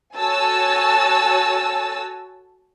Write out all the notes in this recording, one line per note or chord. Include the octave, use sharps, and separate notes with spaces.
F#4 A4 C#5 G#5 A5 E6